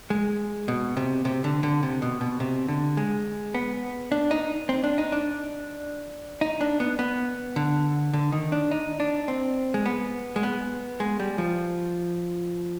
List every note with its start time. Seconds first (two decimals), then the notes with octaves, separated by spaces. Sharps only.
0.10 G#3
0.68 B2
0.97 C3
1.25 C3
1.44 D3
1.63 D3
1.83 C3
2.02 B2
2.21 B2
2.40 C3
2.68 D3
2.97 G#3
3.54 B3
4.12 D4
4.31 D#4
4.69 C4
4.84 D4
4.98 D#4
5.12 D4
6.41 D#4
6.61 D4
6.80 B3
6.99 B3
7.56 D3
8.13 D3
8.32 D#3
8.52 D4
8.71 D#4
9.00 D4
9.28 C4
9.74 G#3
9.86 B3
10.36 G#3
10.43 B3
11.00 G#3
11.20 G3
11.38 F3